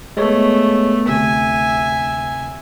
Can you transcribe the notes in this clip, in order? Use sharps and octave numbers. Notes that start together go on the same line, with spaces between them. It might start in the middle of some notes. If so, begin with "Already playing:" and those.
G#3 A3 B3 C#5
D2 C3 E5 G#5